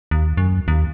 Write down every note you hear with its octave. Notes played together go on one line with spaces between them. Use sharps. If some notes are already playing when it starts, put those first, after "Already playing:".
D#2
F#2
D#2